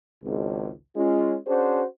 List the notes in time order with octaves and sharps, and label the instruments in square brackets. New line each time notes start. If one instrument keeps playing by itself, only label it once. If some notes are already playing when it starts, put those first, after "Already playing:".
[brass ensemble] G#1 C#2
G#3 C#4 F4
C#4 D4 F#4 G#4 C5